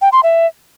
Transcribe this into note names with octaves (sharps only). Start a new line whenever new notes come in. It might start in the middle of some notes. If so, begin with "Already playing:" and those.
G5
C6
E5